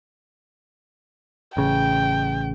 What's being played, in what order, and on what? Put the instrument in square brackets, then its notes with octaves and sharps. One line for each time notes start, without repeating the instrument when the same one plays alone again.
[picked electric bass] A1 C#3 [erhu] G5